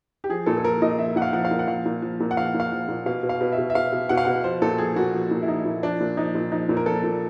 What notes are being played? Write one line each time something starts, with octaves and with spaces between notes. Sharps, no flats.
G4
F3 G#4
A#2 A4
A4
F3 A#4
A#2 D#5
F3 E5
A#2 F#5
F5
F3 F#5
F5
A#2
F#5
F3 F5
A#2
F3
A#2
F#5
F3 F5
A#2
F5
F3
A#2
B2 F5
B2
F5
B2
E5
B2
E5
B2 F5
B2
B2 F#5
F5
B2 F#5
F3 C5
A#2 A4
F3 G#4
A#2 F#4
F3
A#2
E4
F3 D#4
A#2
F3 D4
A#2
F3 D#4
A#2
F3 D#4
A#2
A#4
F3 A4
A#2